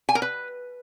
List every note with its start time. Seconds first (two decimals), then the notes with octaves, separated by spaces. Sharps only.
0.09 G#5
0.15 A#4
0.22 B4